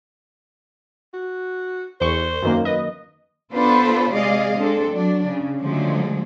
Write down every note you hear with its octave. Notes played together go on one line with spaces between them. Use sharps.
F#4
E2 C5 C#6
F#2 D#3 A#3
B4 D#5
B3 D4 F4 A4 B4 C5
C3 G#3 G#4 D5 D#5 F5
G#3 C4 D4 A4
F#3 D4
C#3
D3 F3 F#3 G#3 A3